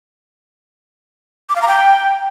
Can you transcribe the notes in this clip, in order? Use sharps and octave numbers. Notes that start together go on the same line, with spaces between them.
D6
F5
A#5
G5